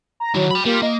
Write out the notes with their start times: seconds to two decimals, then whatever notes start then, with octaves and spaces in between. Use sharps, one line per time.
0.20 A#5
0.35 D#3 F#3 E4
0.51 G5 B5
0.65 G3 A#3 F4
0.82 A#3 D#5